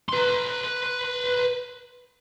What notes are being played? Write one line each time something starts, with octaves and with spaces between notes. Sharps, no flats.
B4 C6